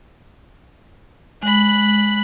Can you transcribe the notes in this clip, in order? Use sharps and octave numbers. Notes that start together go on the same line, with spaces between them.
G#3 B5 F#6